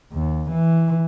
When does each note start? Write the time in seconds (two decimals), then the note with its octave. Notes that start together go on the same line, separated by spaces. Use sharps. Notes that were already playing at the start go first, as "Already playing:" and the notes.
0.13 D#2
0.51 E3